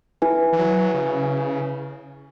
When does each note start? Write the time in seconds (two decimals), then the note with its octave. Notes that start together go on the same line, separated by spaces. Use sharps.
0.22 E4 B4 G#5
0.53 E3
0.59 F#3
0.94 C#3